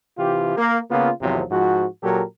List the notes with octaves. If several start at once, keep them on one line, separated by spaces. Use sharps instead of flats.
C3 E3 F4 G4
A#3
C#3 A#3 B3 F4
G#1 E2 C3 F3 F#3
G#2 F3 F#4
A#2 F#3 G4 A4 A#4